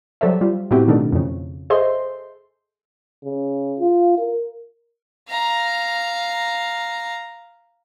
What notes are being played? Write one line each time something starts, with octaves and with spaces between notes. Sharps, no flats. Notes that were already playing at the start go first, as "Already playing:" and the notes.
F#3 G3 A4 C5 D5 E5
G3 F4
A2 B3 C4 E4 F#4 G4
B2 D#3 A3 D4 A4
F2 C#3
G#4 A4 C5 D#5 E5 C6
C#3
F4
A#4
F5 A#5